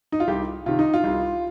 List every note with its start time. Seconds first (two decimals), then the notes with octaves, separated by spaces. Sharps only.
0.12 D#4
0.20 F4
0.28 C2 G4
0.66 C3 D#3 F4
0.79 D#4
0.94 F4
1.04 C2